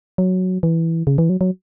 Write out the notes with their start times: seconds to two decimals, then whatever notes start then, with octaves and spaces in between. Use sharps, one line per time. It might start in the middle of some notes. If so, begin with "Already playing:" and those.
0.18 F#3
0.63 E3
1.07 C#3
1.18 E3
1.29 F#3
1.41 F#3